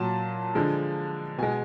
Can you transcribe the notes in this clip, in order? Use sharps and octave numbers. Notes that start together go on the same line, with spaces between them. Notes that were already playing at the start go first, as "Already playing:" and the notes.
Already playing: A#2 F#3 A5
D3 F3 G#3
B2 G#3 G#5